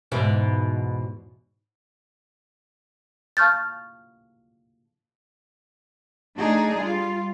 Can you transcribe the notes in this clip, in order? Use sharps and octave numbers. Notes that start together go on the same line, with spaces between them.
E2 G#2 B2
F5 A5 C#6 F6 G6 A6
A3 D4 D#4 G#4
G3 F4